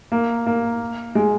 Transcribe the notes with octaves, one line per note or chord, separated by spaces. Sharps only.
A#3
A#3
G#3